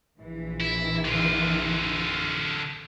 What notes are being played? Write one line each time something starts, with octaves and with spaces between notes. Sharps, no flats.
A#1 E3
E4
D3 F4